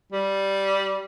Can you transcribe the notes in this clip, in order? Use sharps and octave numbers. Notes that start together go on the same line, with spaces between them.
G3